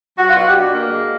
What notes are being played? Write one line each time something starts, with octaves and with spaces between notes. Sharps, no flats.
F#3 F#4
F4
B2 F#4
G4
D4
A#3
G#3